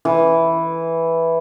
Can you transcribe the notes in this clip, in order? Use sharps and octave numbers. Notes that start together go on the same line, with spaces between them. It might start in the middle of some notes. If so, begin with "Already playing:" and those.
E3